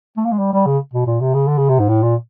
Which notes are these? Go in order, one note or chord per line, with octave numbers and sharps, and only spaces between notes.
A3
A#3
G#3
G3
G3
C#3
B2
A#2
C3
C#3
D3
C#3
C3
G#2
A2
A#2